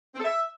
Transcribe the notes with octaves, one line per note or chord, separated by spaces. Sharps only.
C4
A4
E5